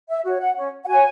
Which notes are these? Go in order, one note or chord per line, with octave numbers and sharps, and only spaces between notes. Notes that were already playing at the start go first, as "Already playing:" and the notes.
E5
F#4 C#5
F#5
C#4
F#5
F#4 C#5 G#5